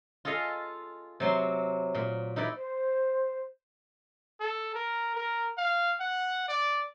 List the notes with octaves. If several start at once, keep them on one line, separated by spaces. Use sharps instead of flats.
F4 G#4 A4 D#5 F5
C3 F#3 C6
A#2
D#4 E4 B4 D5
C5
A4
A#4
A#4
F5
F#5
D5